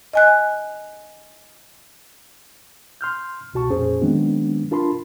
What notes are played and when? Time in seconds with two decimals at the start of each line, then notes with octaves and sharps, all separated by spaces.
0.13 D#5 G#5 F#6
3.01 C6 F6 G6
3.54 C2 B2 F#4 A5 C#6
3.70 F2 A#2 C#4 G#4 C5
4.01 D#3 F#3 G#3 B3 C4 D4
4.71 D4 F4 A#4 A5 B5 C6